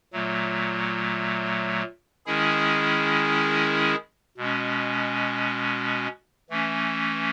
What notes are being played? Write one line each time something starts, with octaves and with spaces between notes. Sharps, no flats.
A#2 F#3 A3
D#3 G#3 C#4 E4 G#4
B2 G#3 C#4
E3 A3 C#4